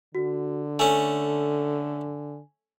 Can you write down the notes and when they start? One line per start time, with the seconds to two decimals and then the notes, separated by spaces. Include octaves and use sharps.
0.15 D3 F#4
0.79 A3 C#4 G#5